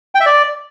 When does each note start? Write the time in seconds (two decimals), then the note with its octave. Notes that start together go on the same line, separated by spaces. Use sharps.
0.15 G5
0.20 E5
0.26 D5